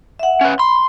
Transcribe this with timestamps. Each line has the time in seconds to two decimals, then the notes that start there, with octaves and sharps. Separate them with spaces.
0.19 E5 F#5
0.41 C#4 B4
0.59 B5 C6